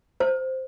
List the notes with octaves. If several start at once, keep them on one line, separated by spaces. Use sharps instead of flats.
C5